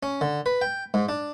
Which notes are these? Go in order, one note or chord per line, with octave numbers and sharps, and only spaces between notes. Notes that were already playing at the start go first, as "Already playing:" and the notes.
C#4
D3
B4
G5
G#2
D4